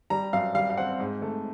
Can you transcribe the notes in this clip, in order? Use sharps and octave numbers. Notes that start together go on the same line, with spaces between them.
G3 A#5
F#2 F5
G3 F5
F5
C4 F#5
G#2
A3